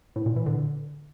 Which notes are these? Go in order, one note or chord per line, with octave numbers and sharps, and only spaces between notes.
A2
A#2
E3
D3